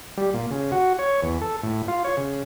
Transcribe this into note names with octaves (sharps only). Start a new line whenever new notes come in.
G3
A#2
C#3
F#4
C#5
E2
A4
A2
F4
C#5
C#3